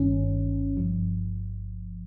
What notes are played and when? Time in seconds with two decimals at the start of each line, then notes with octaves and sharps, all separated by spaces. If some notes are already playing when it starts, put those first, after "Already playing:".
Already playing: G1 G2 D#3 C#4
0.77 G1 G2 F3